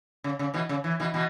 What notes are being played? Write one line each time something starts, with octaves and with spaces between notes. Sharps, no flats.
C#3
C#3
B2 E3
C#3
E3
B2 E3
B2 E3